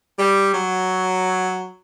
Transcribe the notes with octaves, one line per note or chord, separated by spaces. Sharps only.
G3
F#3